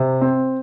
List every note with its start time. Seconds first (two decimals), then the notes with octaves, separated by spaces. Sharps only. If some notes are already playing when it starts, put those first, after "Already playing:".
Already playing: C3
0.21 C4